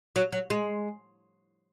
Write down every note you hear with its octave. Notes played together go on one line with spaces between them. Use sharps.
F#3
F#3
G#3